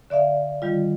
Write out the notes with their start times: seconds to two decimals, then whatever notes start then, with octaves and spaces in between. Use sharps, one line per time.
0.10 D3 D5 E5 F5
0.62 D#3 G3 F4